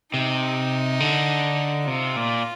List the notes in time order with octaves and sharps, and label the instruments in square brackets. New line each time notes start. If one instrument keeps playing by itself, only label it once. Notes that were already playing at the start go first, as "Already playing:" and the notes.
[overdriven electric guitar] C3 [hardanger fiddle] D#4
[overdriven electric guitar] D3
[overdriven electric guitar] C3 [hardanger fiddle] F4
[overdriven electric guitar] A#2